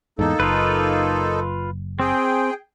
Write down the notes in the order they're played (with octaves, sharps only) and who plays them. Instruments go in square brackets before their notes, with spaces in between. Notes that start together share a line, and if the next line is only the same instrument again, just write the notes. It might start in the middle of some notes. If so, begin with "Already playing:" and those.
[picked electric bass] E2 G#2 [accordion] A#3 D#4 A4
[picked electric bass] F#1 [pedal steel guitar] F4 B4
[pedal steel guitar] C4 [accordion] G#4 G5